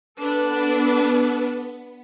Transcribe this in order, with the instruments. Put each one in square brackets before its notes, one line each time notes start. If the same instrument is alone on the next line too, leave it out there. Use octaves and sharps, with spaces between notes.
[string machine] B3 [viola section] D4 A4 B4